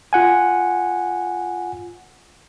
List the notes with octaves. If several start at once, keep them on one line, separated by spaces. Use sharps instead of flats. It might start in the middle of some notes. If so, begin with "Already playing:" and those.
F4 F#5 G#5